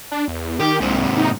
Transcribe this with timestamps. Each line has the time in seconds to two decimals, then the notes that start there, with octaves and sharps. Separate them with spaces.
0.11 D4
0.28 E2
0.60 D#3 G4
0.80 C2 G#2 C3
1.18 D#4